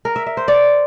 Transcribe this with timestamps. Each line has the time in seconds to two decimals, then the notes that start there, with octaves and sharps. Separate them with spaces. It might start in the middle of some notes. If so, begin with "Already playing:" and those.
0.05 A#4
0.16 E5
0.26 E5
0.37 C5
0.48 D5